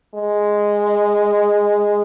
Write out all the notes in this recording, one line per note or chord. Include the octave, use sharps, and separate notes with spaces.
G#3